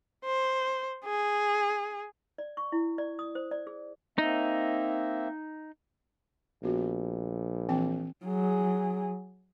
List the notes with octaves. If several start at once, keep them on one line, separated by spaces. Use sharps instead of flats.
C5
G#4
D5
C#6
E4
D5
D#6
C5
D5
G#4
A#3 C4 D#4 E5
A#1 B3 F#4
E3 C4 G5
F#3 G#4